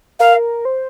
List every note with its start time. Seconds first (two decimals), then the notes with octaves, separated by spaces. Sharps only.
0.20 A#4 F5
0.65 C5